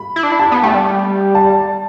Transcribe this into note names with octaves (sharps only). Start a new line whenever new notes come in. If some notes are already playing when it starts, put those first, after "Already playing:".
Already playing: B5
E4
D4
E4
D4 A5
B3
A3 G5
G3
A5